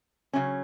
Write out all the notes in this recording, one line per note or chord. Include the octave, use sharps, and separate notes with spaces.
C#3 F#3 C#4